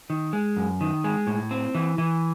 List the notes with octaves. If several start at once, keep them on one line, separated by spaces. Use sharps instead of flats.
D#3
G#3
F#2
D#3
G#3
A2
C4
E3
E3